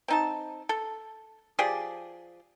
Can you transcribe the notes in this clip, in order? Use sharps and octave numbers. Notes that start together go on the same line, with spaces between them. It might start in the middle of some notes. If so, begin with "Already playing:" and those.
C4 D#4 A5
A4
F3 G4 G#4 D5